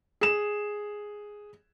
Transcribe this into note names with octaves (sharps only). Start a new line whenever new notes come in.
G#4 E7